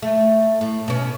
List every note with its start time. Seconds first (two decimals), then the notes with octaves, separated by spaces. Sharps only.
0.02 A3
0.61 A2
0.88 B2 C#4